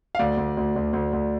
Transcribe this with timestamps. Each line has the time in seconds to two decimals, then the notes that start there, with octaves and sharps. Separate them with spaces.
0.15 F5
0.19 D2 D5
0.38 D2
0.57 D2
0.76 D2
0.93 D2
1.13 D2